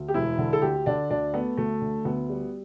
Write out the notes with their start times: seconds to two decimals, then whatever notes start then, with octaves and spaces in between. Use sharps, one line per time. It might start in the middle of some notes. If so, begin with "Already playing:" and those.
Already playing: D2
0.08 G4
0.14 E1 E4
0.38 D3
0.53 A4
0.62 D2 G4
0.86 D3 D4
1.10 D2 D4
1.34 A3 B3
1.57 D2 A3
1.82 D3
2.05 D2 B3
2.29 G3